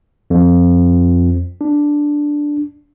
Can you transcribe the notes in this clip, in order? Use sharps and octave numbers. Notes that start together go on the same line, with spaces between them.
F2
D4